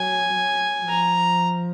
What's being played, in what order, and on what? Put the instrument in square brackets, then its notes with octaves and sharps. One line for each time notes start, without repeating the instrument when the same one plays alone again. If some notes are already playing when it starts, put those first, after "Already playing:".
Already playing: [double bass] F#3 [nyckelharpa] G#5
[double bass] F#3
[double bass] F3 [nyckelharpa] A#5